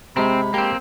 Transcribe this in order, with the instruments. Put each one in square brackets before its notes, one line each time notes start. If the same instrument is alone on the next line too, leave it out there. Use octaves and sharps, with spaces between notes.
[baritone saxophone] C3 [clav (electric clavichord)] G#3 A#5 [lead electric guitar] C4 [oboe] B5
[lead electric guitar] A#3 C4 [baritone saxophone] G4